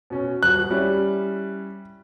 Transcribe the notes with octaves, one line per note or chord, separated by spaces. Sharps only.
B2 C#4
D#1 F#4 F#6
G3 C#4 E4